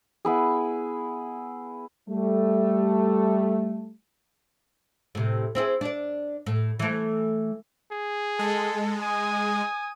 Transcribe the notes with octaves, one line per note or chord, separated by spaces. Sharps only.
B3 E4 G#4
G3 A3
A2 C3
C4 E4 G#4
D4 D5
A2
E3 A3
G#4
G#3 A4
G#5 D#6